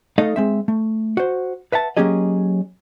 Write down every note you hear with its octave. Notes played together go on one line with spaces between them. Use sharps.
A3 D#4 A4 D#5 F5
G#3 C4 E5
A3
F#4 C5
B4 E5 F#5 A5
F#3 A#3 C#4 G4 G#4 D#5